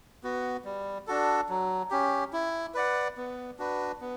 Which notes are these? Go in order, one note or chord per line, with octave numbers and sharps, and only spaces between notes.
B3 F#4
G3
D4 F#4 A4
F#3
C#4 G4
E4
B4 D5 F#5
B3
D4 F#4 B4
B3